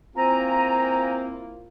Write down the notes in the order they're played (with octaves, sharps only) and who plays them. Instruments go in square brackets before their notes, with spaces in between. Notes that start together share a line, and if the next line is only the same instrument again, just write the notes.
[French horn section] A#3 E4 F4 [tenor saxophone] C4 [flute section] G#5 A#5